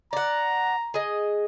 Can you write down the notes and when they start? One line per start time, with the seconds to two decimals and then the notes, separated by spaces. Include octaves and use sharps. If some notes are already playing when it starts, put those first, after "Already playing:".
0.13 D5 F#5 A#5
0.94 G#4 D#5